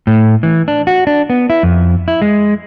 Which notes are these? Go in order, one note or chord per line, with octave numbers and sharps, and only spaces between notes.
A2
E3
D4
F#4
D4
B3
E4
F2
E4
G#3